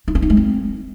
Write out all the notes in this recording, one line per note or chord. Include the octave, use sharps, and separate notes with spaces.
D#4
C#4
D#4
G#3
C4